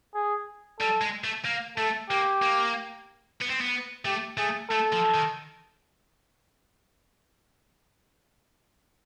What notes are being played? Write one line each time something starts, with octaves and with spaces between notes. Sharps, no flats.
G#4
G3 A4
G#3
A3
A#3
A3 A4
A#3 G4
A#3
B3
C4
B3
A3 G4
A3 G#4
A3 A4
F3
D#3